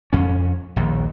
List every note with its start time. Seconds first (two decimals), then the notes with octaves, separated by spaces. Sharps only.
0.13 F2 C#4
0.76 A#1 D#2